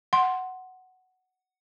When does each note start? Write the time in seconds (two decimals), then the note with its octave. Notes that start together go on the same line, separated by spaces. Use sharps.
0.13 F#5 C6